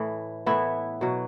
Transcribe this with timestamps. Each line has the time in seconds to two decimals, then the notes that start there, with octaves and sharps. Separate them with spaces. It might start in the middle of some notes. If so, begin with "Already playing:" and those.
Already playing: A2 E3
0.46 A2 E3 B3 E4
1.01 B2 F#3